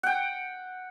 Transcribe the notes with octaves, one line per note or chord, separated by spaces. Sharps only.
F#5 G5